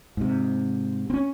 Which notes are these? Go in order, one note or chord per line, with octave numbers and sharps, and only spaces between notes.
G#2 C3
C4 C#4